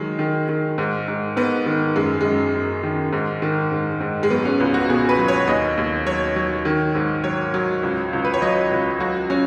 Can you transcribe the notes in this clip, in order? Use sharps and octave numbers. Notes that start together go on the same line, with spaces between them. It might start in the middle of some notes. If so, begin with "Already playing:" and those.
Already playing: D#3 F#3 G#3
D#3
D#3
G#2
G#2
G#2 B3
D#3
F#2 G#3
F#2 G#3
F#2
D#3
G#2
D#3
G#2
G#2
G#3
F#3 B3
C#4
C#2 B3
F#4
B2 G#4
B4
F#3
C#5
D#2 D#5
D#2
F#3 C#5
F#3
D#3
G#2
F#3 C#5
F#3
C#2
C#2
B4
C#5
F#3 D#5
C#2
F#3 F#4
F#3 C#4